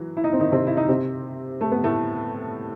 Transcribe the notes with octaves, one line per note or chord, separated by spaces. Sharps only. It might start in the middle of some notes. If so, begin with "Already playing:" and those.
Already playing: E3 F#3
E4
D#4
C4
D#3 D#4
C3 C4
E4
D#4
C3 C4
A3
B3
A2 A3